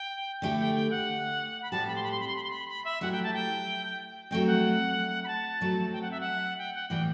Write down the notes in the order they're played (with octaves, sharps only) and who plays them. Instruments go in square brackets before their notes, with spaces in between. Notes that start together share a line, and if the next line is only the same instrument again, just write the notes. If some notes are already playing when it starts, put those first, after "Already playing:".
Already playing: [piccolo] G5
[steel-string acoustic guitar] D3 A3 E4 G4 [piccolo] G5
[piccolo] G5
G5
F#5
B5
[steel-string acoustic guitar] A2 G3 C4 G4 [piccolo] A5
[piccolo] B5
C6
B5
C6
B5
C6
B5
C6
B5
B5
E5
[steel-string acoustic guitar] F#3 A3 E4 G4 [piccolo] F#5
[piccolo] G5
A5
G5
[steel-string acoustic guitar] F#3 A3 C4 [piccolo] G5
[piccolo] F#5
B5
A5
[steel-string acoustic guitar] F#3 A3 C4
[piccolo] G5
F#5
E5
F#5
G5
F#5
[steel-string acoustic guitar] A2 E3 G3 [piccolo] G5